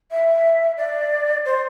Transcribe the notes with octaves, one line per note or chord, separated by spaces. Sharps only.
E5
D5
C5